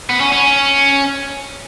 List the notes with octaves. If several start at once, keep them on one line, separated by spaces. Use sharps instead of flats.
B3
C#4
C#4